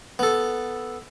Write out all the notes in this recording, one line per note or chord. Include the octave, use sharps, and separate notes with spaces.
B3 A4